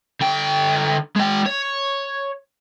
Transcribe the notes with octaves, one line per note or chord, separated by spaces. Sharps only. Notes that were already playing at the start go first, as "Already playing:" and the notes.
D3 G5
G#3 G5
C#5